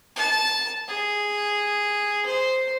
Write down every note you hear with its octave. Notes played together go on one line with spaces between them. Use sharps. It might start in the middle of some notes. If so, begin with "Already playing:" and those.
A5
G#4
C5